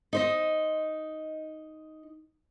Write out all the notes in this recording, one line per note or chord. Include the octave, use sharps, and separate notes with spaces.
D#4 C5 D#5